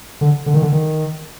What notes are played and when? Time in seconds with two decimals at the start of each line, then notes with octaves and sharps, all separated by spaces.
0.21 D3
0.46 D3
0.54 D#3
0.62 D3
0.73 D#3